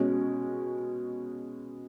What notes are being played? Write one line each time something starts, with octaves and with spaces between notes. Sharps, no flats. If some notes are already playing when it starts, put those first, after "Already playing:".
Already playing: B2 G#3 C#4